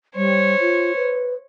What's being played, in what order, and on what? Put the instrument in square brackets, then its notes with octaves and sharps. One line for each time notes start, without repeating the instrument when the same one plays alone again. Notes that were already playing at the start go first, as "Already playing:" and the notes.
[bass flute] G3 [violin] C5 C#5
[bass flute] F4
B4